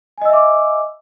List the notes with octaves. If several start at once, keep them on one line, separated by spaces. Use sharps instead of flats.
D#5 E5 G#5 D6 E6